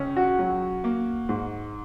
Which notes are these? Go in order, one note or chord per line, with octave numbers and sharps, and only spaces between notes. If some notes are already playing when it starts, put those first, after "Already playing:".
Already playing: C#2 C#4
F#4
F#3
A#3
G#2